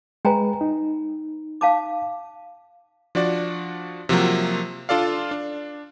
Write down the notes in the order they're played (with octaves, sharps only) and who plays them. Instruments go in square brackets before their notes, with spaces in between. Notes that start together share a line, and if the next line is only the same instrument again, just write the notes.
[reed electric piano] G#3 B4 [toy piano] G5 G#5 A#5
[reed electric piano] D#4
[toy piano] F5 A5 D6
[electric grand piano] F3 D4 F#4 D5
C3 F3 F#3 A#3
D4 F4 A4 D5 F5
D4